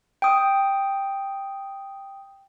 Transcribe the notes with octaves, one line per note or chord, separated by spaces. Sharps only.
G5 D#6